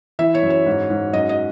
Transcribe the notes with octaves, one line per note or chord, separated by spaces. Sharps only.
E3 E5
C#5
F#2
C#5
G#2
G#2
F#2 D#5
D#5